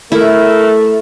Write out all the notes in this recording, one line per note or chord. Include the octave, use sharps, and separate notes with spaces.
A3 E4 A#4